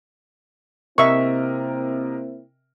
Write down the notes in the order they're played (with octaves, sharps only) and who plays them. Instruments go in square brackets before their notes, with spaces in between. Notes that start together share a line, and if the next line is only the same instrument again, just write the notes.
[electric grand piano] C3 A#4 D#5 [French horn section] A#3 C4 E4 [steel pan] E5 C#6